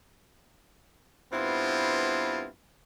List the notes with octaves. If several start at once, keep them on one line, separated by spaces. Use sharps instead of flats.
G2 B3 C4 E4 F4